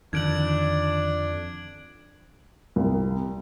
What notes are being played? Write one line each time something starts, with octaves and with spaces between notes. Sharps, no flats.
F2 D3 D#3 D4 G#6 D7 F#7
C2